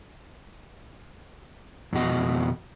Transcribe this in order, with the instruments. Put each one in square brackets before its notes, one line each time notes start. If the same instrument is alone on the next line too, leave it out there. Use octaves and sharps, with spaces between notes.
[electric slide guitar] F2 B2 F#4 D#5